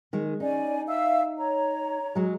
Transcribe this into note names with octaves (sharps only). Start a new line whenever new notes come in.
D#3 G#3
C#4 D#4 D5 G#5
E5 F5 E6
C#5 A#5
F#3 G#3